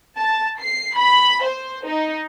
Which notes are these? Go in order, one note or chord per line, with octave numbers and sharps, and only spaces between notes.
A5
C7
B5
C5
D#4